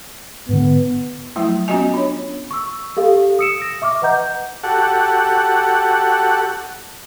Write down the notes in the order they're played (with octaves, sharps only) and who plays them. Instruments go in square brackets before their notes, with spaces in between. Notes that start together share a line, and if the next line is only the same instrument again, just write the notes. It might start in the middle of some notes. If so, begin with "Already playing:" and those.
[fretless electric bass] G#2 D3 [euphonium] B3
[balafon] F3 F#3 A3 E4
B3 C#4 F4 F#4 D#5 G#5
D4 C#5
[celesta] C#6 E6
G4 A4 F5
D#6 E6 C#7 D7 E7
A#6
E5 C#6 D6 F6
B4 D#5 F#5 A#5 G6
[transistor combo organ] F#4 G4 A4 F#5